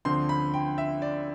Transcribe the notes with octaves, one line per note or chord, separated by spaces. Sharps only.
D2 D3 F3 C4 C6
B5
G5
E5
D5